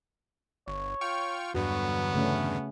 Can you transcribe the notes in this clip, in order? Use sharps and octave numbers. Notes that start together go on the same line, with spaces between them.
G1 C#5
F4 G5 C#6 F6
E2 G2 D3 F#3 B3 F#4
C#3 A3 C#4